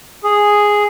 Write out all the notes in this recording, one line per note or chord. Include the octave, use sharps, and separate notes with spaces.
G#4